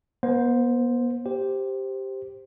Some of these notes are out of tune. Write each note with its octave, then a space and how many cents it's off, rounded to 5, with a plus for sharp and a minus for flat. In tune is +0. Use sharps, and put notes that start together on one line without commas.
B3 -40 C5 +0
G4 +0 C5 +0